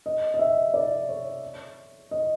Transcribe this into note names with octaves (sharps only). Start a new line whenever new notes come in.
D#5
D#5
E5
D5
C#5
D#5